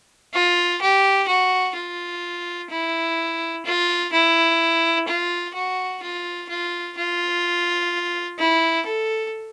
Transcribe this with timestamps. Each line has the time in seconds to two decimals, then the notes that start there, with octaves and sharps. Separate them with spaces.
0.34 F4
0.81 G4
1.28 F#4
1.76 F4
2.70 E4
3.65 F4
4.13 E4
5.07 F4
5.54 F#4
6.02 F4
6.49 F4
6.97 F4
8.39 E4
8.86 A4